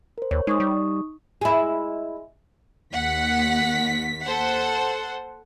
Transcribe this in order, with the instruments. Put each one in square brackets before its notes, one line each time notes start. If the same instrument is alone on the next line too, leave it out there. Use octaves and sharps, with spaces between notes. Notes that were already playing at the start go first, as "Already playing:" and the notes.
[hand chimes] A#4 C5
[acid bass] D#2 [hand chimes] C#5
[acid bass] G#3 [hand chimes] D#4 C#6 D#6
[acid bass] G3
[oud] G#3 E4
[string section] D#2 B6 [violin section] F#5
[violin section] A4 C5 F#5